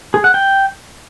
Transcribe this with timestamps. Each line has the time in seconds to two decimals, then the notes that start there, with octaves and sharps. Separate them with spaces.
0.14 G#4
0.24 F#5
0.34 G5